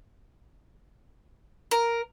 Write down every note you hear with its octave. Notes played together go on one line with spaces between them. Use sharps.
A#4